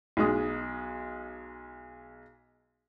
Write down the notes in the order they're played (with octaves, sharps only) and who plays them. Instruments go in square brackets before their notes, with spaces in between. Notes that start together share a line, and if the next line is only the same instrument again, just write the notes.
[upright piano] B1 G#3 D#6